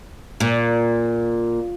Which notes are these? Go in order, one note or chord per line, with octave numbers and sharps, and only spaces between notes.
A#2